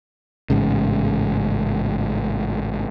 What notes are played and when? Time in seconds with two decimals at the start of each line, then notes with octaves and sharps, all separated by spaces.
0.50 A1 G#2 C#3